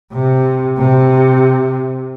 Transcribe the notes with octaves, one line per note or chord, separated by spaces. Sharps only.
C3
C3